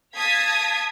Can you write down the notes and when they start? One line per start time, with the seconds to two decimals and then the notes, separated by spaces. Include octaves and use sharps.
0.16 F5 A5 D#6 G#6 B6